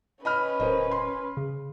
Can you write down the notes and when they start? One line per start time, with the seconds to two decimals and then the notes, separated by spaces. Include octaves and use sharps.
0.25 C#4 B4 D#5 B5 F6
0.60 D1 A#4 C5 D#5
0.91 C6
1.37 C#3